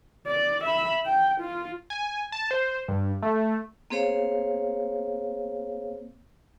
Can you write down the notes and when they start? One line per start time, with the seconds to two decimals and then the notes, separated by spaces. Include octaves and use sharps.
0.27 D5
0.65 E5 B5
1.06 G5
1.41 F4
1.90 G#5
2.32 A5
2.51 C5
2.88 G2
3.23 A3
3.90 A#3 C4 G#4 C5 C#5 F5